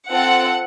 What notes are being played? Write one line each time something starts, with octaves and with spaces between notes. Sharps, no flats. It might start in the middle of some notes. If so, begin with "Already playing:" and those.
C4 F4 A4 F#5